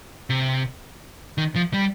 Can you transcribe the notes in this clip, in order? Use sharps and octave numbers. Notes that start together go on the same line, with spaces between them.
C3
D#3
F3
G3